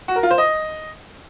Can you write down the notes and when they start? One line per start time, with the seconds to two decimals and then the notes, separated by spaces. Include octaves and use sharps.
0.08 F#4
0.16 A#4
0.23 F4
0.31 C5
0.38 D#5